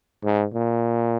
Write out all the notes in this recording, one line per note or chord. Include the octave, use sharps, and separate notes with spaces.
G#2
A#2